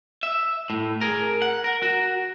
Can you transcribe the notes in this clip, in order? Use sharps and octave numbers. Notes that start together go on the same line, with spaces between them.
E5
A2
G#4 A#4
F#5
A#4
F#4